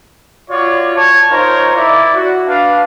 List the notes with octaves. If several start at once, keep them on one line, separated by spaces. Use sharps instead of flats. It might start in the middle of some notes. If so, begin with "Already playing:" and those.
F4 F#4 C#5 D5
C#5 A5
D#4 F4 A#4 C5 C#5
E4 D5
F#4
D4 B4 F5